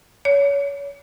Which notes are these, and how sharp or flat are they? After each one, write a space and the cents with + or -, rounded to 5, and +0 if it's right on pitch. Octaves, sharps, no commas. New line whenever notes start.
C#5 +30